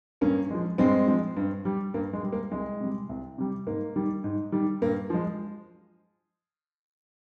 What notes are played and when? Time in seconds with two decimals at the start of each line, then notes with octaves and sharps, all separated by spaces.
0.21 G2 A#3 C#4
0.50 F3 G#3
0.78 G2 G#3 C4
1.08 F3 G#3
1.37 G2
1.65 G3
1.94 G2 A#3
2.13 G#3
2.23 G3
2.32 A#3
2.52 C2 G#3
2.80 C3 G3
3.09 C2
3.38 C3 G3
3.67 G#2 A#3
3.96 D#3 G3
4.24 G#2
4.52 D#3 G3
4.82 G2 A#3
5.10 F3 G#3